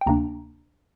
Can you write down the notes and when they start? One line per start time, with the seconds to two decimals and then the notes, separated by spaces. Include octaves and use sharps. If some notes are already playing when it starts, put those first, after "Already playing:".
0.01 G5
0.06 D2 C3 A#3 D4 A#5